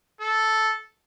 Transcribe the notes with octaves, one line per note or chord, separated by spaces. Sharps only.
A4